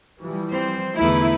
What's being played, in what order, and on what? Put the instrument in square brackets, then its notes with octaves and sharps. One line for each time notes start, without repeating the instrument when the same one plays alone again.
[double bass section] E3 F3 G3
[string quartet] C4 C5
[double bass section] E2 D3 [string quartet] A3 D#4 B4 [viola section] E4